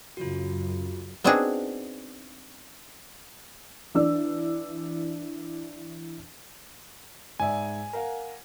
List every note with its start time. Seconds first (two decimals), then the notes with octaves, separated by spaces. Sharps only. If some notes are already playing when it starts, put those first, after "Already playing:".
0.17 F#2 C#3 F4 F#4
1.24 B3 C4 D4 D#4 F#4 G#4
3.94 E3 D4 E6
7.40 G#2 D5 E5 G#5
7.93 A#4 F5 F#5